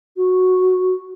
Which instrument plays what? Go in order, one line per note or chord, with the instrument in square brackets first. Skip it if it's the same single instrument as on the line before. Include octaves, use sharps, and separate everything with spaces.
[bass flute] F#4